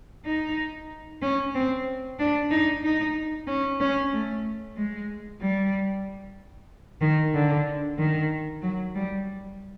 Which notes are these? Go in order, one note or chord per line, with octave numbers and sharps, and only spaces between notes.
D#4
C#4
C4
D4
D#4
D#4
C#4
C#4
A3
G#3
G3
D#3
D3
D#3
F#3
G3